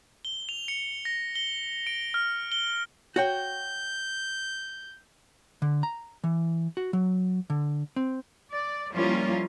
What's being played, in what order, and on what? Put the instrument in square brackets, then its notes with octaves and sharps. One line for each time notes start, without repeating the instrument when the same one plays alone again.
[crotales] G7
F7
C#7
A#6
G7
D7
F6
G7
[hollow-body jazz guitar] F#4 C#5 G5 [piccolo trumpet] G6
[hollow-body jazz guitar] D3
A#5
E3
F#4
F#3
D3
C4
[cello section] D5
F3 G3 A#3 C#4 E4 F4